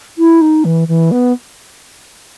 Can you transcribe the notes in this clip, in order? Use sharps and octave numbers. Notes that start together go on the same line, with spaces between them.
E4
D#4
E3
E3
B3